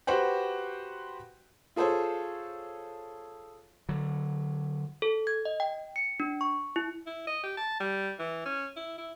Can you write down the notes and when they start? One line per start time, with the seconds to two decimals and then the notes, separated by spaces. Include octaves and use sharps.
0.07 F#4 G4 B4 C5 F#5 G5
1.76 F4 G#4 A4 C5 C#5
3.89 D3 F#3
5.02 A4
5.27 G#6
5.45 D#5
5.60 G5
5.96 C#7
6.20 D4
6.41 C#6
6.76 E4
7.06 E4
7.27 D#5
7.43 G4
7.57 A5
7.80 G3
8.19 E3
8.45 C#4
8.77 E4
8.98 E4